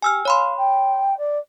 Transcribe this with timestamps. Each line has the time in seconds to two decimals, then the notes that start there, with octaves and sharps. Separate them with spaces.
0.02 G4 G#5 E6 F6
0.25 C#5 F5 B5 C6
0.57 G5
1.17 D5